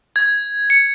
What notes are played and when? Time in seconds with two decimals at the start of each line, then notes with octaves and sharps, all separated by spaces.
0.16 G#6
0.70 C#7